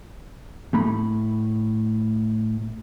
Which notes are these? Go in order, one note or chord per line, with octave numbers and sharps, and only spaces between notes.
A2 A3 B5